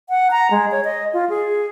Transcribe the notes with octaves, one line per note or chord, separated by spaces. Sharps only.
F#5
A#5
G#3
C#5
D#5
F4
G#4